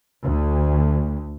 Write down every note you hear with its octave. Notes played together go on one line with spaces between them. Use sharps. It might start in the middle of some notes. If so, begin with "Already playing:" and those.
D2